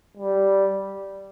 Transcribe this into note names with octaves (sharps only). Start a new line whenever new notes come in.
G3